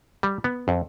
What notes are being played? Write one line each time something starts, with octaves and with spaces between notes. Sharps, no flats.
G3
B3
F2